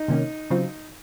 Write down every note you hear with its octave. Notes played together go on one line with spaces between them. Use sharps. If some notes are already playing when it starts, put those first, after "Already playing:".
Already playing: D#4
C3 D#3 A#3 C#4
C#3 F#3 C4 F4